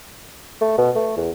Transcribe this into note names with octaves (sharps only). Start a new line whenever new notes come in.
A3
B2
A3
E2